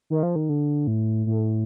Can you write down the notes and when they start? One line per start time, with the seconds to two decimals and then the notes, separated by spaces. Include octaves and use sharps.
0.10 D#3
0.23 F3
0.36 D#3
0.49 D3
0.87 A2
1.26 A2